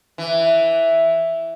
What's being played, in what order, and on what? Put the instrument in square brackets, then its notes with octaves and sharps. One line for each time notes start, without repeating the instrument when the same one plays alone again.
[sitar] E3